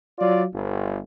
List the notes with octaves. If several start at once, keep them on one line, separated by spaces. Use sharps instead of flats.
F#3 F4 D5
G1